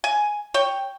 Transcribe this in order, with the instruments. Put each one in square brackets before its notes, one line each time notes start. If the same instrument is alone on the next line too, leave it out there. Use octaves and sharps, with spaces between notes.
[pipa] G#5
C#5 G5